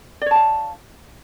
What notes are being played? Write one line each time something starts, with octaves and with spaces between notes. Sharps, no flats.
C#5 D5 F5 A5